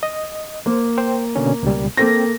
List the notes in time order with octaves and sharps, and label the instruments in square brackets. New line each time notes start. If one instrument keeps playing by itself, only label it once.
[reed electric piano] D#5
[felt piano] A#3 [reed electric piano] C5
[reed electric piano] C5 G5
B2 D3 C#4
C#2 B2 G3
[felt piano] A#3 A4 A#6 [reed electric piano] C4 G5